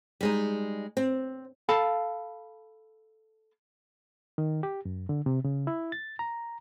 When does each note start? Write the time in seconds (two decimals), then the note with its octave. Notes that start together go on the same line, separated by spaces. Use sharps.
0.21 G3 G#3 D#4
0.97 C4
1.69 A4 F5 A5 B5
4.38 D#3
4.63 G4
4.85 F#2
5.09 D3
5.26 C3
5.44 C#3
5.67 E4
5.92 A6
6.19 A#5